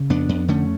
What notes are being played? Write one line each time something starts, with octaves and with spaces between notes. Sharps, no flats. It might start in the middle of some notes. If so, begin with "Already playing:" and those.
Already playing: C#3
F2 B3 D4
F2
D3 A3 C#4